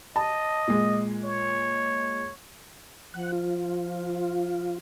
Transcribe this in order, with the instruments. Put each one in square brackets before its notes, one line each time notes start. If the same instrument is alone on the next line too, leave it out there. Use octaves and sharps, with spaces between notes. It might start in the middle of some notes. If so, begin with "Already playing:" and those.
[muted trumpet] D#5 [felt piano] A5
[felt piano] A#2 G#3
[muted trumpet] C#5
[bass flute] F3 [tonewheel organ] F#5
[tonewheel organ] F4